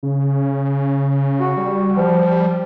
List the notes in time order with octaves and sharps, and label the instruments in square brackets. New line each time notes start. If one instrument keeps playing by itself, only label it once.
[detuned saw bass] C#3
[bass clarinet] F#4
[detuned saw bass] G3
[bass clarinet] F3